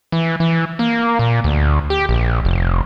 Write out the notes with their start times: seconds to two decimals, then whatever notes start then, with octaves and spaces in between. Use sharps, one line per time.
0.12 E3
0.40 E3
0.79 A#3
1.19 A#2
1.44 D2
1.90 G4
2.09 A#1
2.45 F1